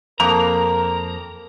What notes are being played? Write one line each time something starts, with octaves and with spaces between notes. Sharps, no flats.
F2 A#3 A#4 A#5